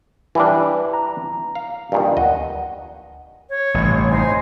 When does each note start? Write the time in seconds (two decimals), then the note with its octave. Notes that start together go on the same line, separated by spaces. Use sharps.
0.35 E3 G3 D4 B4
0.93 A#5
1.55 F5
1.92 G2 A#2 D#3
2.17 D2 D#5 F#5
3.48 C#5
3.74 A1 G2 C3
4.10 D#4 C5 G#5